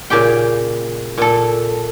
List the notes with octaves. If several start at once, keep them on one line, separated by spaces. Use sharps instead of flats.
A#2 C#3 G4 G5
A#2 A4